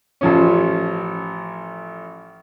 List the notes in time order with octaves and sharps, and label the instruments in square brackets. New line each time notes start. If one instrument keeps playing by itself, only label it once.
[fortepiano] A1 F3 C#4